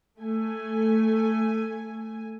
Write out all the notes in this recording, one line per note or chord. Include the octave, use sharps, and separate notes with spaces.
A3 G#5